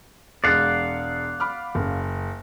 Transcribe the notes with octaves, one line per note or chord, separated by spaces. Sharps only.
E1 G#3 D5 F5 F#5
B5 D6 F6
F#1